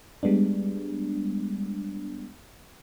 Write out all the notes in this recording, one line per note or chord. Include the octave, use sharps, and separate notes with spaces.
G3 G#3 B3 D4